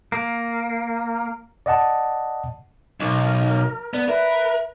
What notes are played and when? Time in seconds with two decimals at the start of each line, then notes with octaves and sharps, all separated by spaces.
0.12 A#3
1.66 D5 D#5 F#5 A5
3.00 B1 A#4
3.94 B3 D5
4.09 A#4 B4 E5